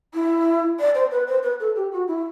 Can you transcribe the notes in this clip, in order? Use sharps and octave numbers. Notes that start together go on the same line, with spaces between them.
E4
D5
C5
B4
C5
B4
A4
G4
F#4
E4